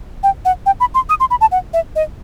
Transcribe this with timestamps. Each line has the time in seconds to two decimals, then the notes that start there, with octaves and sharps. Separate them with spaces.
0.23 G5
0.45 F#5
0.66 G5
0.80 B5
0.94 C6
1.09 D#6
1.20 C6
1.31 B5
1.41 A5
1.52 F#5
1.73 E5
1.96 D#5